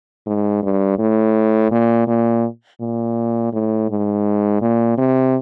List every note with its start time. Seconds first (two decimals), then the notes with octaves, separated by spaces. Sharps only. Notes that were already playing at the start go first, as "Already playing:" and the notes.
0.27 G#2
0.63 G2
0.99 A2
1.71 A#2
2.07 A#2
2.81 A#2
3.53 A2
3.90 G#2
4.62 A#2
4.98 C3